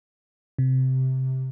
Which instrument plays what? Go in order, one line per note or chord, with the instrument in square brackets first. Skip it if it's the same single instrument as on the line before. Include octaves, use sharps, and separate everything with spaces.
[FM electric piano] C3